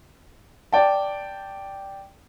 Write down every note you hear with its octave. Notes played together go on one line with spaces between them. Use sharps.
D5 G5 A5